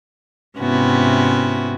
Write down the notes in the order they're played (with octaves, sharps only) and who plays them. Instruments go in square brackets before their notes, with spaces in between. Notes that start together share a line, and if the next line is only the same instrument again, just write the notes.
[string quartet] G#2 C3 B3 C#4 E4 F#4